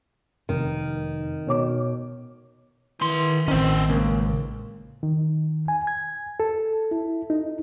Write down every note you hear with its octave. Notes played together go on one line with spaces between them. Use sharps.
F1 D#3
B2 C#5 D6
D#3 E3 C6
A1 D#3 C4 C#4 C5
C#2 A#3
D#3
G#5
G#6
A4
E4
D#4